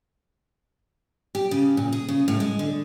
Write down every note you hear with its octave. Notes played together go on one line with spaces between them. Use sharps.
G4
C#3
A#2
G#4
C#3
A2
G#3
D3